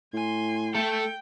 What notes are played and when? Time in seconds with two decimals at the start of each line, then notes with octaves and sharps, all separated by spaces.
0.14 A2 G#5 C6
0.75 A3 A4 G5